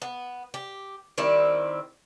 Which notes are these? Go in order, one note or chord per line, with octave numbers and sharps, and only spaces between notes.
B3
G4
D#3 G3 C4 E4